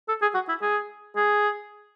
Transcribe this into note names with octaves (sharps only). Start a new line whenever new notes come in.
A4
G#4
F#4
E4
G#4
G#4